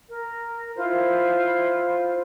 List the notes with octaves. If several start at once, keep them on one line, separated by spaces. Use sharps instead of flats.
A#4
E4 F4 C5